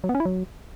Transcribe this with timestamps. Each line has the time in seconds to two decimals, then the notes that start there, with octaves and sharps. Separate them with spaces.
0.04 F#3
0.09 B3
0.15 C#4
0.20 E4
0.25 F#3